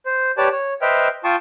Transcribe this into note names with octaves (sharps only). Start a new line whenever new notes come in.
C5
G4 B4 C#5 D5 A5
C#5
B4 C5 D#5 E5 G5 F6
F4 G5 A5 C6 C#6 D#6